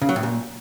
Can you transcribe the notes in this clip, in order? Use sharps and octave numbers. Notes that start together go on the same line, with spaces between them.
C#3
F#3
A2
A#2